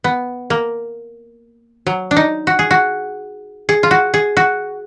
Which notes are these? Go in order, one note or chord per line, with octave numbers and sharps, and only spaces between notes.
B3
A#3
F#3
D4
D#4
F#4
G#4
F#4
G#4
F4
F#4
G#4
F#4